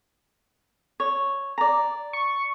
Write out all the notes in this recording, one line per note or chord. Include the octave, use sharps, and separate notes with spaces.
C#5
D5 A#5
C#6